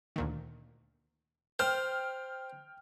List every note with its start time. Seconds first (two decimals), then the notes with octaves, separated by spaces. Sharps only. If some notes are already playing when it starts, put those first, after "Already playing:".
0.16 D2 A#2 D#3
1.59 C5 G5 F6